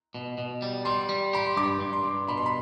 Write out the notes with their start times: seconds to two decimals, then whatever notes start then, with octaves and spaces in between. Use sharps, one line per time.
0.14 B2
0.38 B2
0.62 G3
0.85 G3 C6
1.09 G3
1.33 G4 B5
1.46 C6
1.57 G2 D6
1.81 G2
1.93 C6
2.04 G2
2.28 B2 B5
2.37 C6
2.46 B5